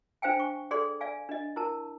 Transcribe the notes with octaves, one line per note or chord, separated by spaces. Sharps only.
D4 C5 F5 G5 G#5
C#6
G#4 A4 D5 C6
D5 F5 G#5
D4 D#5
E4 A#4 A5